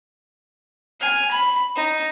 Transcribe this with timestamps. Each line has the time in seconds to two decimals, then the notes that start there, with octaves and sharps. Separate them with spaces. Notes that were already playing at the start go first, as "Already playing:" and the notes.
1.01 G#5 F6
1.32 B5
1.76 D#4